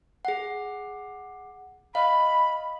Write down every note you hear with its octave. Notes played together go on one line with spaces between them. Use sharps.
G#4 F#5
D#5 F5 B5